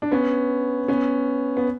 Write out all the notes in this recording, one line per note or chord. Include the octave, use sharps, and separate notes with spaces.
D4
B3 C#4
B3 C#4
B3